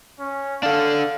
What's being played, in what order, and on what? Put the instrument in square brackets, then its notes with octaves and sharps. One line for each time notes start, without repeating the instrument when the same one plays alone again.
[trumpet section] C#4
[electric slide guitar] D4 A4 [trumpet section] F5